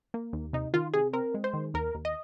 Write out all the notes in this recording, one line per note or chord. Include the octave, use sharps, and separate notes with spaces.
A#3
D#2
C3 D#4
D#3 F4
C3 G#4
C4 A#4
G#3
C5
D#3
D#2 A#4
D#2
D#5